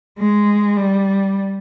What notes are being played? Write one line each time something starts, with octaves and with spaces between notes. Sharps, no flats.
G#3
G3